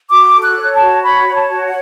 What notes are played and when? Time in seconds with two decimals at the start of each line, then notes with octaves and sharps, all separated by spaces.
0.10 F#4 D6
0.33 A4
0.42 F#6
0.57 C#5
0.73 A5
0.81 F#4
1.03 C#5 B5
1.27 C#5
1.35 A5
1.51 F#4
1.66 F#5